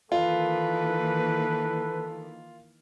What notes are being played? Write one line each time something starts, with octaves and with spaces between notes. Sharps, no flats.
D#3 E3 A#3 F4 A4 B4